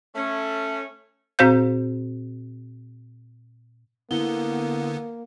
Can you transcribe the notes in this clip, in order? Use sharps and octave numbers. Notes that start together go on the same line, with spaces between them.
A3 C#4
A#2 C4 F#4 C5 F5 G6
D3 A#3 B3 E4 G7